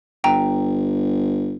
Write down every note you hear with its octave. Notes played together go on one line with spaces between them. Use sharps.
G1 G5 A#5